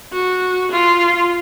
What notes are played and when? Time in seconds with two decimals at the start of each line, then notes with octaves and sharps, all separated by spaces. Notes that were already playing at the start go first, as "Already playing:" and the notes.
0.13 F#4
0.72 F4